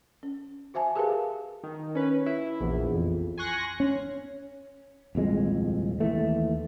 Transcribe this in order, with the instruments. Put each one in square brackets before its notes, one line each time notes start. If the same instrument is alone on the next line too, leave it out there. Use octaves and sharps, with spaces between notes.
[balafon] C#4
F#4 C5 E5 G#5 A5
G4 G#4 A#4 B4 F5 A5
[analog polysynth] D#3
C#4 B4
E4
A#1 E2
F2
G#5 C6 C#6 F#6 A#6
[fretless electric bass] C#4
D#1 C2 F2 G#3
D#2 E3 A3